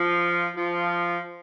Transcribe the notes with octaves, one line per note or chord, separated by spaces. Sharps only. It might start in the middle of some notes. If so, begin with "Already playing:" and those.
Already playing: F3 F4
F3 F4